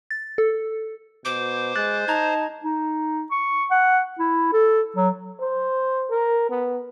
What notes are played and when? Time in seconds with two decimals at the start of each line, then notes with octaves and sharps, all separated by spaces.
0.11 A6
0.38 A4
1.25 B2 C5 D6
1.76 G#3 F#6 A6
2.08 D#4 A5 A#5 G#6
2.65 D#4
3.31 C#6
3.71 F#5
4.19 E4
4.53 A4
4.97 F#3
5.40 C5
6.10 A#4
6.50 B3